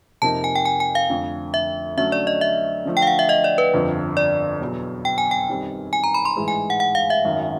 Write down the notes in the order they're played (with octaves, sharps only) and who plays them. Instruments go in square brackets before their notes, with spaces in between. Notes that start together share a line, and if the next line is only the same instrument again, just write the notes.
[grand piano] F2 C3 F3 A#3 D#4 [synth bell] A5
[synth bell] G#5
G5
G#5
G#5
F5
[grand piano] F2 D3 F3 A3 C4
[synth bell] E5
[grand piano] D3 F#3 A3 C#4 F#4 [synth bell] E5
[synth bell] D5
D#5
E5
[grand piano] D3 F3 A3
[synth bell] G5
F5
F#5
E5
D#5
D5
B4
[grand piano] G1 F2 D3 F3
[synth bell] D5
[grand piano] E2 B2 F#3 B3
[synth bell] G5
G#5
G5
[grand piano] F#2 D#3 G3 C4
[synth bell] G#5
A#5
B5
C6
[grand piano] A1 G#2 E3 G#3
[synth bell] G#5
F#5
F#5
F5
E5
[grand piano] G#1 F#2 D#3